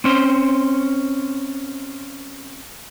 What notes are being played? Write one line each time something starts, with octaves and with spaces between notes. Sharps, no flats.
C4 C#4 C5